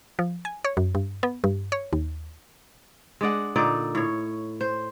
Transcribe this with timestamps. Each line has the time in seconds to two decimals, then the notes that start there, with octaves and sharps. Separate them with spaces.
0.19 F3
0.45 G#5
0.64 C#5
0.77 F#2
0.95 G2
1.23 B3
1.44 G2
1.72 C#5
1.93 D#2
3.21 G#3 D4 D5 F#5
3.56 A#2 D3 D#4 D5
3.95 A2 C#5
4.61 C5